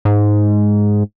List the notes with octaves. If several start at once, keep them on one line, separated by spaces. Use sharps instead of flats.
G#2